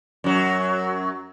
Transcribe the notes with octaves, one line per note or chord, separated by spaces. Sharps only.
F#2 F#3